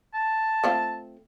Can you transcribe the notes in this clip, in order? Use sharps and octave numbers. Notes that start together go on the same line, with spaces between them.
A5
A3 C4 F4